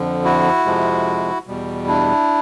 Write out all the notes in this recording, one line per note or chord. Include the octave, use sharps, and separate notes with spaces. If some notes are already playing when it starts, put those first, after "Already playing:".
Already playing: F2 D3 F3
E4 F#4
F2 C3 F3 G#3
E2 B2 G3
D4 E4